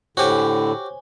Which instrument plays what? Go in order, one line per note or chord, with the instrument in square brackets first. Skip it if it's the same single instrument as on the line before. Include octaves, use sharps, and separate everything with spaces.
[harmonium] A2 D3 [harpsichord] F#4 G4 [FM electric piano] C5 C#5 G#5